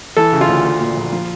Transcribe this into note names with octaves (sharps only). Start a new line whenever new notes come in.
E3 A4
C#3
F4
D2
A3
A#2
A#1
F3